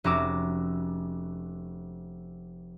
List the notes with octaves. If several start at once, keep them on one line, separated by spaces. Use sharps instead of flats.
F1 C#4 F#4 A#5 D6 E6